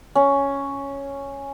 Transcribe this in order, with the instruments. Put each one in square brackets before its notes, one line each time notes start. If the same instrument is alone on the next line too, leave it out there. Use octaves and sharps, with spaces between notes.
[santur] C#4